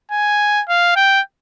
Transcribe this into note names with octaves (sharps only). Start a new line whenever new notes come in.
G#5
F5
G5